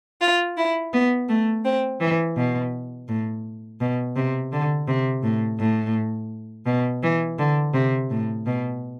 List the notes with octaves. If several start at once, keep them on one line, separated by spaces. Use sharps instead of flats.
F4
E4
B3
A3
C4
E3
B2
A2
B2
C3
D3
C3
A2
A2
B2
E3
D3
C3
A2
B2